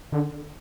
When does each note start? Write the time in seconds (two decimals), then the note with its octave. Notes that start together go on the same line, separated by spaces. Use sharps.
0.12 D3